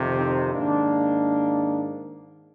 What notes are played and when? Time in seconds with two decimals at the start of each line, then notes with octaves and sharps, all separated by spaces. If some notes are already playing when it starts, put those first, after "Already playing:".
Already playing: F2 C3 D#3
0.18 C4 D#4
0.54 G#2 D#3 A#3 D4